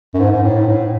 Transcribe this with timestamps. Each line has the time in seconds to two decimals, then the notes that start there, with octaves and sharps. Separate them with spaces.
0.14 F#2
0.20 G#2
0.32 G#2
0.43 A2
0.61 G#2
0.67 A2